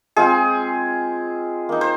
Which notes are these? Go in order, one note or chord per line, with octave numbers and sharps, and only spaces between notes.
G#3 C4 F4 G#4
A#3 D#4
C5